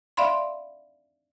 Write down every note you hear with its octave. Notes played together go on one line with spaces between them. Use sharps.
D5 E5 F5 B5 C6